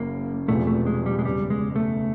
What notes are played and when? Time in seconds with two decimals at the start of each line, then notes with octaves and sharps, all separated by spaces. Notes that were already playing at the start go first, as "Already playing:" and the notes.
Already playing: F#1 F#2 C#3 A#3
0.48 E1 E2 C3 F3 A3
0.67 A3
0.86 G#3
1.06 G3
1.19 G#3
1.24 F#1 E2 C#3 G3
1.50 G#3
1.76 A3